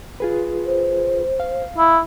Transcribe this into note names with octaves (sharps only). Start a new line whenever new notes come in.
F4 G#4 B4
C5
F5
E4